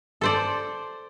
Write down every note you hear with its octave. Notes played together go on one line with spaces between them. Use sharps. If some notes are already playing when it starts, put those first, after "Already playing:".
A4 C5 D5